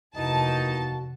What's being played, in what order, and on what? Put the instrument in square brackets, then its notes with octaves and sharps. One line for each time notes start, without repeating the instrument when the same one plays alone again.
[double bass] F1 [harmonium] D#2 F#4 [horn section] E3 A#3 D#4 [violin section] A5